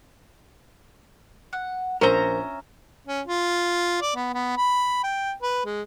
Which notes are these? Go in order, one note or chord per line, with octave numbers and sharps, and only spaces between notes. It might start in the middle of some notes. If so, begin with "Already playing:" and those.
F#5
A#1 C#4 A#4 C5 E5 A#5 G7
C#4
F4
D5
B3
B3
B5
G5
B4
G#3